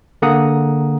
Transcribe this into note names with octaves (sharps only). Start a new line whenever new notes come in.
D3 A#3 G#4 F#5 A#5 D#6